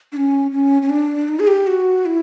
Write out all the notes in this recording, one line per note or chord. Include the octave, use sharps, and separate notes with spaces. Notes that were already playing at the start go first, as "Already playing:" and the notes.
D4
C#4
C#4
C#4
D4
D#4
G#4
G4
F#4
E4